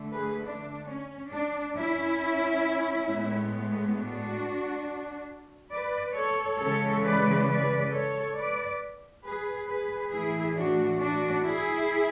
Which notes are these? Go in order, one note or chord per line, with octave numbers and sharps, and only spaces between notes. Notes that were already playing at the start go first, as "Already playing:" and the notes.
Already playing: D3 A3
G#4 B4
D4
C#4
D4
C#4 E4
A2 G#3 B3
D4 F#4
B4 D5
A4 C#5
C#3 E3 G#3 A4 C#5
B4 D5
B4 D5
A4 C#5
B4 D5
G#4 B4
G#4 B4
A2 E3 A3 E4 G#4
D4 F#4
D4 F#4
E4 G#4